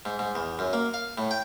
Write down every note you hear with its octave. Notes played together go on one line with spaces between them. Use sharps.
G#2
G#2
E2
F#2
A#3
F5
A2
G5